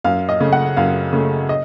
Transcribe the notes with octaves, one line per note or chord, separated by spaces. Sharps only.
F#2 F5
D#5
C#3 A3
F#5
F#2 F5
C#3 A3
D#5